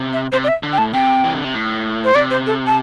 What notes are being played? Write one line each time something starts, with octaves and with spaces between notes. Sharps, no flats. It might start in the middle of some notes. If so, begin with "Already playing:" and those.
Already playing: C3
E5
C3 C5
D5
E5
D3
G5
A2 A5
C3 G5
E3
D3
C3
A2
C5
C3 D5
C5
A4
A5